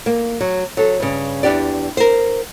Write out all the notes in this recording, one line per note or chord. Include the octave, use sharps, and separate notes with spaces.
A#3
F#3
F#3 A4
G2 C#3
E2 D4 G4 D5
A#4 C5